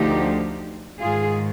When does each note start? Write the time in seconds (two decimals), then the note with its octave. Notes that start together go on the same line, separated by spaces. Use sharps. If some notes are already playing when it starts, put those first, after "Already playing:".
Already playing: D2 D3 F3 D#4 G4
1.00 G#2 D#3 F4 G#4